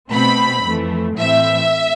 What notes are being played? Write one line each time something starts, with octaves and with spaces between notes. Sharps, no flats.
B2 A3 C4 B5
F2 E3 A3
A2 E3 A3 C4 E5